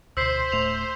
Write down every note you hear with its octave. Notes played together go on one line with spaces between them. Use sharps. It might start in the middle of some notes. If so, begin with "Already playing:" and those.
D2 B2 C5 E6 B6 C7
D1 A2 A3 F7